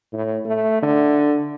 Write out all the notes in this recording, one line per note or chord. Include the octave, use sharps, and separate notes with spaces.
A2
A3
D3